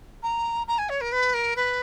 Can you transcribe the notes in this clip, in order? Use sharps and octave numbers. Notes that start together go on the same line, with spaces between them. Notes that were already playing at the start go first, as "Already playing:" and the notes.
A#5
A#5
G#5
C#5
A#4
B4
A#4
B4